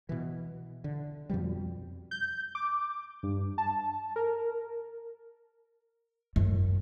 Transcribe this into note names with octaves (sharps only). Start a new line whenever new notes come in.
B2 E3
D3
F2 B2 F3 G3
G6
D6
G2
A5
A#4
F#2